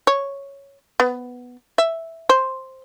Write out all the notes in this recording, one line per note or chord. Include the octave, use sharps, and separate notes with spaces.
C#5
B3
E5
C5